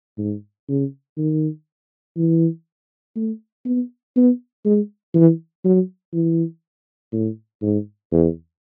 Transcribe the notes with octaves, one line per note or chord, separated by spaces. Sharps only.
G#2
C#3
D#3
E3
A3
B3
B3
G#3
E3
F#3
E3
A2
G#2
E2